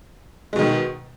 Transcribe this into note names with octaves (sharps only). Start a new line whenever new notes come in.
B2 D#3 G#3